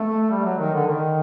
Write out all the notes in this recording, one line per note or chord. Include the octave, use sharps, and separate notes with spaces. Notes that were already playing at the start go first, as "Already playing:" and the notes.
Already playing: A3
G3
F#3
D#3
D3
D#3